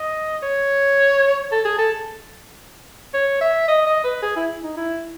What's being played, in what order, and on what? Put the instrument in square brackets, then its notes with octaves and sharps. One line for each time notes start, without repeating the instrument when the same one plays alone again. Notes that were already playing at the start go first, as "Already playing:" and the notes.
Already playing: [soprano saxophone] D#5
C#5
A4
G#4
A4
C#5
E5
D#5
D#5
B4
G#4
E4
D#4
E4